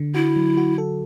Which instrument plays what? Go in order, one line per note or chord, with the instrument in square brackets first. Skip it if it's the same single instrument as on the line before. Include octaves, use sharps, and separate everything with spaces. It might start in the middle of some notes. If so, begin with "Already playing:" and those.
Already playing: [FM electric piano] D3
[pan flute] E4 [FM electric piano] F#4
[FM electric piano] F#3
F#4
A4